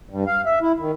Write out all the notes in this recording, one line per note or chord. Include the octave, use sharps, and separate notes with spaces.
G2
F5
E5
E4
D#3